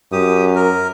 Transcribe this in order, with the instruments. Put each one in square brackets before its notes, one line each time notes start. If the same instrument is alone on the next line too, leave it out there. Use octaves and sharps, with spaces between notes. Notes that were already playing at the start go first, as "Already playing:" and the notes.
[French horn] F#2 [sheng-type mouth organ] G4 D#6
[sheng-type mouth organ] A#4